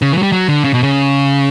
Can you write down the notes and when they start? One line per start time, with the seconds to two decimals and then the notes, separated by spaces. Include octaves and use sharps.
0.02 C#3
0.12 E3
0.18 F#3
0.23 G3
0.32 F#3
0.49 D3
0.64 C#3
0.74 B2
0.83 C#3